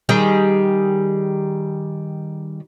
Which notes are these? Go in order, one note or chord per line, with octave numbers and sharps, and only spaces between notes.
D#3 G3 G#4